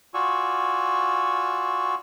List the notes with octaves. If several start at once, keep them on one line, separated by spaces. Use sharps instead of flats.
F4 F#4 D5 G#5 C#6 E6